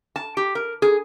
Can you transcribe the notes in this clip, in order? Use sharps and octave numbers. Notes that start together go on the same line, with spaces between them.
A5
G4
A#4
G#4